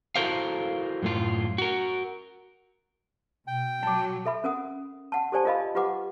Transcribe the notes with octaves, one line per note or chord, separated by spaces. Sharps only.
E4 F#4 A4 A#4 C5 F5
F#2 A2 F4
F#4 A#4
B2 G5
F#3 A5 D6
A4 E5 B5
C#4 A#4 F#5 D#6
F#5 A5
G4 A4 C5 D5 G#5 A5
F4 A#4 D#5 F5 B5
F4 G4 B4 F#5 D6